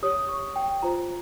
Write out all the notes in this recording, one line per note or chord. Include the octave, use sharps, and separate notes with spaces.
G4 C#5 D#6
C#6
G5
F4 C5 A#5